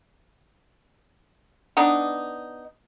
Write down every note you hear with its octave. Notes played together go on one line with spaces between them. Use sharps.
B3 D4 D#4